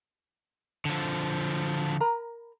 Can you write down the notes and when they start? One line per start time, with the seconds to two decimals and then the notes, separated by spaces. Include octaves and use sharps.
0.85 D3 F3
2.00 A#4 A#5 B5